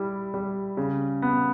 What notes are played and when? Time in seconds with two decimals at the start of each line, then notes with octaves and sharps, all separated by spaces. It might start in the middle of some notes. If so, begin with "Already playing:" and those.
Already playing: G3 E4
0.34 G3
0.77 C#3
1.22 B3